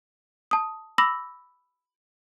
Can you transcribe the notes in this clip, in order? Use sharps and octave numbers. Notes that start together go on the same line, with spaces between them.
A5 D#6
B5 D6 E6 A#6 F#7